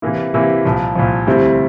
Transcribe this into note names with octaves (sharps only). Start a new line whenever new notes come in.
C3 E3 A#3 E4
C3 E3 A#3 E4
C2 A#2 F3
C2 A#2 F3
D2 C3 G3 C4 E4